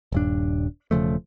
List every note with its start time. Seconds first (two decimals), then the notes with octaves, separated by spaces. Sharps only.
0.12 D#1 G2 D4
0.91 E1 C#3 F3 A3